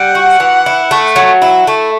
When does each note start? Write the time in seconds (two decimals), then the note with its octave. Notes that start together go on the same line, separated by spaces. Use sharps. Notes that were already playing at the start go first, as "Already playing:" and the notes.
Already playing: G3 F#5
0.15 F#4
0.40 E3
0.66 E4
0.91 A3
1.16 F#3
1.42 E4
1.67 A3